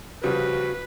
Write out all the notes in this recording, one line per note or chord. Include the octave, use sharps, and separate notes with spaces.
C#3 F3 G3 F#4 B4